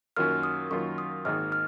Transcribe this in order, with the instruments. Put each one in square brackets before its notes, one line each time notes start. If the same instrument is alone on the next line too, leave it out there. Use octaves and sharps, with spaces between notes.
[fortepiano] F#2 D#3 F#3 A#3 F4 [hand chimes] F6
[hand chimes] D#6
[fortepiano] F#2 D#3 F#3 A#3 F4 [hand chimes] C#6
[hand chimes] D#6
[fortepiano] G#1 G#2 D#3 A#3 [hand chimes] F6
[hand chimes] F6